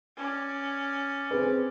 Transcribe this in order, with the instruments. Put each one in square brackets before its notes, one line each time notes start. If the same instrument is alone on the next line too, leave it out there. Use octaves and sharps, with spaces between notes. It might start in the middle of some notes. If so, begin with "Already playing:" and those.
[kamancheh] C#4 D5
[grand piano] C4 G#4 B4